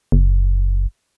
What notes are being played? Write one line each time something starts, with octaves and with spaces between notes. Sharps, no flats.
F#1